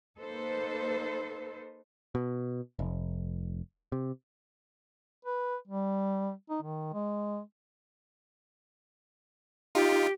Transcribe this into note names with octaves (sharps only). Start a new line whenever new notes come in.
A#3 D#4 A4 B4 C5
B2
F1
C3
B4
G3
D#4
D#3
G#3
D#4 F4 G4